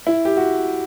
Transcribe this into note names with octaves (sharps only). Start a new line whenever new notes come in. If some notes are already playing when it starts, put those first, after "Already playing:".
E4
G4
F#4